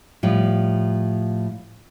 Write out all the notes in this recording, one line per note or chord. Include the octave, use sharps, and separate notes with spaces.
A2 F3 G3